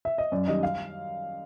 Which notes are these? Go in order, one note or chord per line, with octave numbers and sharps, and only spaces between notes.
E5
D#5
F#2 D5
D#3 G3 D#5
F5